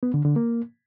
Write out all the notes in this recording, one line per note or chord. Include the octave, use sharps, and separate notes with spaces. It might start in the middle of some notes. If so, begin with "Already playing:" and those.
B3
D3
D3
A#3